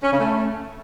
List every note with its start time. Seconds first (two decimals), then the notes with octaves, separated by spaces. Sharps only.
0.03 C#4
0.11 C#3
0.19 A3